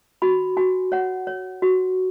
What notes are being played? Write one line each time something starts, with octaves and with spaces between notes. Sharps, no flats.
F#4 B5
F#4 G#5
C#5 F#5
C#5
F#4